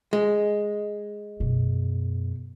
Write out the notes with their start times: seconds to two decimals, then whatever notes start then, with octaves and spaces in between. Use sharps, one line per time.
0.13 G#3
1.40 F#2 B2